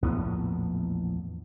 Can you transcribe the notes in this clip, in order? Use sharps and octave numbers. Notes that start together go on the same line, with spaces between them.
A#1 E2 A2 B3